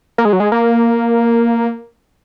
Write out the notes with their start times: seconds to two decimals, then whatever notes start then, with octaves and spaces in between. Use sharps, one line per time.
0.18 A#3
0.25 G#3
0.33 F#3
0.40 G#3
0.52 A#3